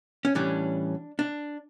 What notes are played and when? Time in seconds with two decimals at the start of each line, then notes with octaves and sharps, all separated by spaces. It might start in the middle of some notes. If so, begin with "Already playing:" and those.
0.25 C#4
0.35 A2 E3 G3 C#4 D4
1.19 D4